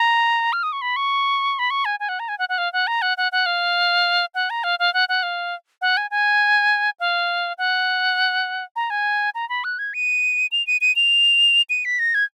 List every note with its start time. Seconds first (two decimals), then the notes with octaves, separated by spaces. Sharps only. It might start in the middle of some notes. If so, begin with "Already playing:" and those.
Already playing: A#5
0.53 F6
0.63 D#6
0.72 C#6
0.81 B5
0.96 C#6
1.59 B5
1.70 C#6
1.85 G#5
2.00 G#5
2.09 F#5
2.19 A#5
2.28 G#5
2.38 F#5
2.49 F#5
2.58 F5
2.73 F#5
2.87 A#5
3.02 F#5
3.17 F#5
3.32 F#5
3.46 F5
4.34 F#5
4.50 A#5
4.64 F5
4.79 F5
4.94 F#5
5.09 F#5
5.23 F5
5.81 F#5
5.97 G#5
6.11 G#5
7.00 F5
7.58 F#5
8.76 A#5
8.90 G#5
9.35 A#5
9.49 B5
9.64 F#6
9.79 G#6
9.94 D#7
10.52 F7
10.67 D#7
10.81 D#7
10.96 F7
11.69 D#7
11.85 B6
11.99 A#6
12.14 G#6